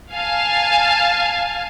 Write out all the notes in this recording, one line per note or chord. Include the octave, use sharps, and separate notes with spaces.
F5 G#5 A5